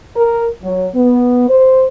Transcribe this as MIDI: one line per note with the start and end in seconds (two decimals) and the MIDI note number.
0.16 0.46 70
0.63 0.89 54
0.95 1.47 59
1.49 1.85 72